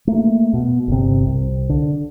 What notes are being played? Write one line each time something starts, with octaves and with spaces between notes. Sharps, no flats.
A3 A#3
B2
G1 C3
C2
D3